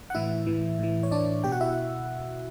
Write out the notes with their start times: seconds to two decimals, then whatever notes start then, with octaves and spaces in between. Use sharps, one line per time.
0.10 F#5
0.15 A2 E3 E4 E5
0.46 A2 E3
0.79 A2 E3
1.03 C#5
1.11 A2 E3 D4 D5
1.44 B2 G4 G5
1.52 F#4 F#5
1.61 E4 E5